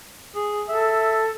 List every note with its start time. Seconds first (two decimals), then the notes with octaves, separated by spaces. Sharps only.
0.35 G#4
0.69 A4 E5